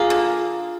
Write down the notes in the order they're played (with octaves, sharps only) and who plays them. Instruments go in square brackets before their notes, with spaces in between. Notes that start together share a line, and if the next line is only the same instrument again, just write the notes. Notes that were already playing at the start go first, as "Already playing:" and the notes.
Already playing: [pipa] A#3 [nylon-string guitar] F4 G#4
[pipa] D3